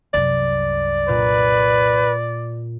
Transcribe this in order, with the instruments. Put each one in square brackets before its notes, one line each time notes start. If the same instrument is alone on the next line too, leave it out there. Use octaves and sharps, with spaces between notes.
[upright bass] C2 F#2 [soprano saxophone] D5
[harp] A#2 [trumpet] B4